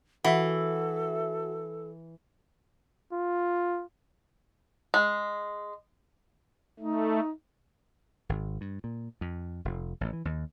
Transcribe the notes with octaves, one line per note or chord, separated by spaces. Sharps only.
E3 F#4 A4 E5
F4
G#3
A3 D#4
G#1
G2
A#2
F2
F1
A1
E3
D#2